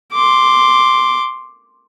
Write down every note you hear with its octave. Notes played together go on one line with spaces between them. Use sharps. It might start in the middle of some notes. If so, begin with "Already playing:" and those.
C6 D6